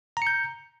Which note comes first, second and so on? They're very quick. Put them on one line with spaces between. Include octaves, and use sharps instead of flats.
A#5 C#7 G6